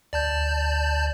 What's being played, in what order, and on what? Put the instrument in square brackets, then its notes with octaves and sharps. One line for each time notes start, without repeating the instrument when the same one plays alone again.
[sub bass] D2 [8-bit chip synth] D5 A5 G6